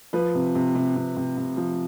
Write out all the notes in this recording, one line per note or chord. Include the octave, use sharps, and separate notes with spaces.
F3 B4
C3
C3
C3
C3
C3
C3
F3